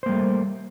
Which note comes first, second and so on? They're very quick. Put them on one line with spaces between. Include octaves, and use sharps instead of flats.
C5 A#3 G3 A3